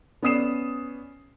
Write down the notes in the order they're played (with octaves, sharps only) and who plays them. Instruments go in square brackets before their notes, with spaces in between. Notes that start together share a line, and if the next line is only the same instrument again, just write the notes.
[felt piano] B3 C#4 D5 D#6 C7 E7